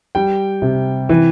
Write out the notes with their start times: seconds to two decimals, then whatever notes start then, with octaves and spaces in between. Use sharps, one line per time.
0.15 G3 G5
0.62 C3
1.09 E3